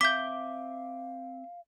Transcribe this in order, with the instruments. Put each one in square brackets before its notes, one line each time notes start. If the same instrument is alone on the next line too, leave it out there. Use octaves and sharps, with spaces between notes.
[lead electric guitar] C4 E5 [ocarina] F5 [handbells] D6 [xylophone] G6 B6